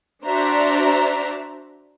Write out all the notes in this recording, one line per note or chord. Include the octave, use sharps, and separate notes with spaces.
D4 F#4 C5 D5 E5 A#5